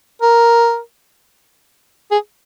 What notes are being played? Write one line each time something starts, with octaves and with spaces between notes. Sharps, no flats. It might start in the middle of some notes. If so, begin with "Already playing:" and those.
A#4
G#4